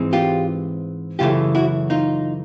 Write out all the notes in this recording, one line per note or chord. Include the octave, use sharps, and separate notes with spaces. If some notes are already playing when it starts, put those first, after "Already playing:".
Already playing: G#2 E3 G#3 C4
F4 G4
F#2 C#3 E3 A3 F4 G4
E4 F#4
D#4 F4